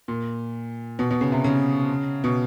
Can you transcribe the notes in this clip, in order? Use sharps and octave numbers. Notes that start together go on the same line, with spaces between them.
A#2
B2
B2
C#3
C3
C#3
B2